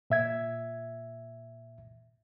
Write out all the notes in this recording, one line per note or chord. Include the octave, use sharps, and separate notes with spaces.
A#2 E5 G#6